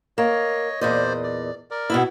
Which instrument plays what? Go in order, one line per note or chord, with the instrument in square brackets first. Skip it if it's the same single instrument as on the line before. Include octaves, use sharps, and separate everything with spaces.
[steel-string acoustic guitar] A#3 [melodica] C#5 D#5
[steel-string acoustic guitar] E2 A#2 D#5 [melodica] C5 D5
[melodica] D5
A#4 D5
[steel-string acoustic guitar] B2 B3 E4